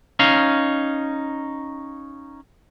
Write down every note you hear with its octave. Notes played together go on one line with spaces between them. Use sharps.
C#4 D#4 F5